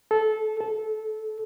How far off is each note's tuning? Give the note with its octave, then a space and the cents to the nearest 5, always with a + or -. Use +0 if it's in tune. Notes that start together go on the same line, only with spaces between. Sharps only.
A4 -20
A4 -20